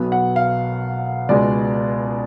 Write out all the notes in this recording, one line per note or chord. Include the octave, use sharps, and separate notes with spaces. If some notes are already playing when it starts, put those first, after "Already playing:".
Already playing: B1 B2 F#3 B3
F#5
F5
C#2 B2 G#3 D5